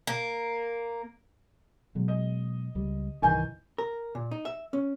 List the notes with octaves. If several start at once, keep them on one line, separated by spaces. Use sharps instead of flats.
A#3
B2 F#3 G#3
D#5
C#2 G3
C2 G2 D#3 E3 G#5 G6
A#4
A#2
D#4
E5
C#4